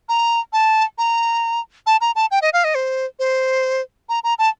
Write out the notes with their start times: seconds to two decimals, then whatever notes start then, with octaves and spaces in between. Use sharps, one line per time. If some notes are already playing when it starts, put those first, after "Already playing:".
0.09 A#5
0.53 A5
0.98 A#5
1.86 A5
2.01 A#5
2.15 A5
2.31 G5
2.42 D#5
2.53 F5
2.64 D#5
2.75 C5
3.19 C5
4.09 A#5
4.24 A#5
4.39 A5